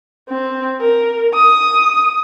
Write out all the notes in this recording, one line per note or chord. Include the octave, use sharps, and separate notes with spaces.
C4
A#4
D#6